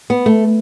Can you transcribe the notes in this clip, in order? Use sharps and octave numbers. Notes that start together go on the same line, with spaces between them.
B3
A3